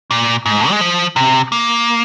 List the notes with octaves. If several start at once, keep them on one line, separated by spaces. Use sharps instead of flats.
A#2
G#2
G#3
F3
C3
A#3